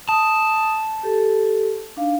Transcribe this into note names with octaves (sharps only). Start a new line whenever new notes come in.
A5 D#6
G4 A4
D4 D#4 F5